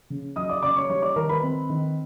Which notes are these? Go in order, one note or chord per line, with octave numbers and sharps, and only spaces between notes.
C#3
F#3 D#5 D#6
D5 D6
C#3 D5 D6
C#5 C#6
G3 C#5 C#6
D5 D6
D#3 A#4 A#5
B4 B5
C4
D#3